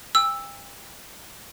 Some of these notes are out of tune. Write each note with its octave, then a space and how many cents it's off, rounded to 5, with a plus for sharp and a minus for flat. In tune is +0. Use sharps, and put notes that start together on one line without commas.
G5 +35 E6 +0